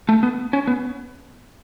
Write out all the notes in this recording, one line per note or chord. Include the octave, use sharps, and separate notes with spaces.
A3
B3
C#4
B3